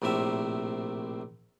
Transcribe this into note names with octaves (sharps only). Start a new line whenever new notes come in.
A#1 A2 C3 A#4 E5